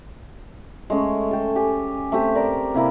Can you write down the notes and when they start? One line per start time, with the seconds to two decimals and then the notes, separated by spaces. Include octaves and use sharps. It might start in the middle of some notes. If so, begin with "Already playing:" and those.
0.90 G#3 A3 C#4
1.31 A4 G5
1.56 G4 G#5
2.12 A3 C4 G4
2.35 A#4 D5
2.74 C3 A#3 E4 A#4